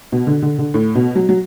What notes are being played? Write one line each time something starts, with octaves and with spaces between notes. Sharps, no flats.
B2
D3
D3
D3
A2
B2
F#3
F#3